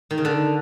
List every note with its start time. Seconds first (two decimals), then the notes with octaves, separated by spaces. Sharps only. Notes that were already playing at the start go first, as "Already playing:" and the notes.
0.11 D#3
0.18 C#3
0.25 D3